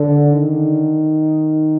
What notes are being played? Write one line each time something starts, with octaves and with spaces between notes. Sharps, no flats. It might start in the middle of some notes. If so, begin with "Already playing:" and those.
Already playing: D3
D#3